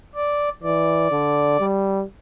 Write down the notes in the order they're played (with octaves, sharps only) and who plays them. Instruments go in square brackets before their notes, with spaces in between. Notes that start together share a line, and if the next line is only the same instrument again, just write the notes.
[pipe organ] D5
[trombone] E3 [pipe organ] D5
[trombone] D3
G3